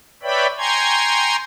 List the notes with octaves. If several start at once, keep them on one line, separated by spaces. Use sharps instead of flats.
B4 C#5 D5 E5 G5 B5
G5 G#5 A#5 C6 C#6 G#6